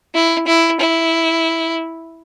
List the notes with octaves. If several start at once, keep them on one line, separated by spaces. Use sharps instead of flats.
E4
E4
E4